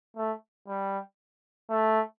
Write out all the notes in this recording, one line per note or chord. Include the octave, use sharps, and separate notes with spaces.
A3
G3
A3